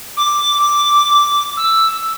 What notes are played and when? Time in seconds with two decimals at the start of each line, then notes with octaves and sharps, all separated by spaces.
0.17 D6
1.57 E6